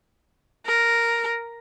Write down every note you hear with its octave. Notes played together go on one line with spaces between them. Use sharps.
A#4